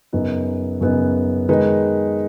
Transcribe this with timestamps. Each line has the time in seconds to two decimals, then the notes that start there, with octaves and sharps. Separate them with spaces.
0.13 F#2 C#3 B3 D#4
0.81 F#2 C#3 B3 D#4
1.49 D#3 G#3 D#4 B4